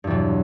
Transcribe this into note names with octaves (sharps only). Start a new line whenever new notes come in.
E2 G2 B2 F#3